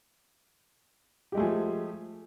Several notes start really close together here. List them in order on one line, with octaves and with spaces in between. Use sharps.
G4 G#3 A3 G#4 F3